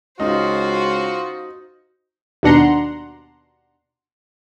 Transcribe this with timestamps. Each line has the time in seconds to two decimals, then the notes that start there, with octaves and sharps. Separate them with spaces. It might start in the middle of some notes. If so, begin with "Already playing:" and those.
0.20 C#2 D#4 F4 F#4 C5
2.43 D#2 B2 D4 F#5 A#5 C6